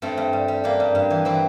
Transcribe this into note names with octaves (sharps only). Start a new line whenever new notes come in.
G2 A3 C4
G2
G3
G3
G3 A#3 D4
G2
G2
E3
E3 C4 E4